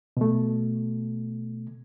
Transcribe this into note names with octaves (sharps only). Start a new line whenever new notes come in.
B2 A3